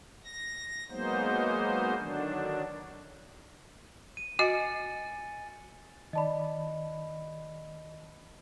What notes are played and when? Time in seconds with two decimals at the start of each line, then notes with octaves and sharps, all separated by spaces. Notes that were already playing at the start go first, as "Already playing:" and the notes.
0.25 A#6
0.90 F#3 G#3 A#3 B3 D#4 C5
1.99 D3 D#3 F#3 D4
4.17 D#7
4.39 F#4 D#5 G#5 A6 C#7
6.13 D#3 D5 D#5 A5 B5